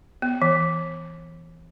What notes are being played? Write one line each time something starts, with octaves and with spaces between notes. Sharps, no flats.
B3
E3